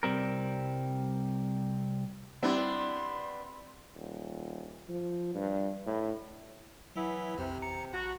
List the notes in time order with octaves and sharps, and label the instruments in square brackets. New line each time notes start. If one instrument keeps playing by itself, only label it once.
[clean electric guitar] C2 G3 C4 A#4
[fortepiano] G3 C4 E4 [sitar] B3 D4 [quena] C6
[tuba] D#1
F3
G2
A2
[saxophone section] E3 B3 E4 [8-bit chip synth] F#3
[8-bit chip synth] B1 F2 [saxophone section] C3
[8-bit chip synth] A1 A#5 C#7
[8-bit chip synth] A#1 [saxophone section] F#4